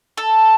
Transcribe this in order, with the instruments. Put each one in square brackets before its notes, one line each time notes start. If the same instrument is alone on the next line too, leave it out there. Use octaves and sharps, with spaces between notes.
[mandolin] A4